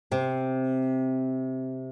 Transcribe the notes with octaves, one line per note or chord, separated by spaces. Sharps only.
C3 C4